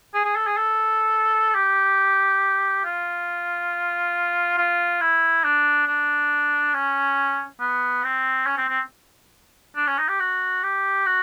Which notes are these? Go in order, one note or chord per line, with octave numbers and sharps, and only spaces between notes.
G#4
G#4
A4
G#4
A4
G4
F4
F4
E4
D4
D4
C#4
B3
C4
C#4
C4
C4
D4
C#4
D#4
G4
F#4
G4
F#4